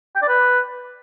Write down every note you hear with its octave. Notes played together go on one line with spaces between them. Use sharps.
G5
D5
B4